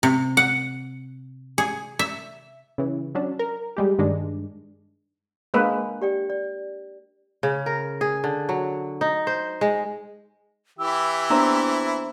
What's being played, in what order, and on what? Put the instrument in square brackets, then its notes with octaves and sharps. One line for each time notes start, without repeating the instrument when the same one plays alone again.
[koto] C3
F#5
G#4
E5
[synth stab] C#3 E3
F#3 C#4 D4
A#4
G3 G#3 G4
G2 D#3 G#3 D4
[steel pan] G#3 A#3 B4 [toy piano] D4 A#4
[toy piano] G4 D5 G5
D5
[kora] C#3
A#4
G#4
D3
F#3
D#4
C5
G#3
[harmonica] E3 E4 G4 [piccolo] E6
[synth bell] A#3 B3 D4 [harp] C5 E5 A#5